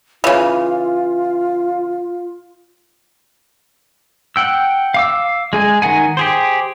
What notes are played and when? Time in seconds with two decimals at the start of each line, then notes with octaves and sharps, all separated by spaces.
0.24 C#3 E3 F4
4.36 F#5 G5 E6
4.94 F5 D6 E6
5.53 G#3 G#4 G#5
5.82 D#3 A#4 F#5 G#5
6.17 G4 G#4 C5